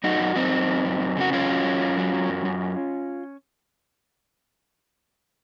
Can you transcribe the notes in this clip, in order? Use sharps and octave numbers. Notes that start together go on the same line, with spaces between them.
F#2 D#4 F#4
F#2
F#2 C4 D#4
F#2
F#2
F#2
F#2
C#3 F#4
F#2 C#4 F4
F#3
F#2
F#2
F#3
F#3
F#2
F#2